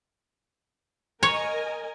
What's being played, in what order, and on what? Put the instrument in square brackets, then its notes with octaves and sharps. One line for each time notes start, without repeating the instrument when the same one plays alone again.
[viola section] A#4 D#5 G#5 [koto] C#5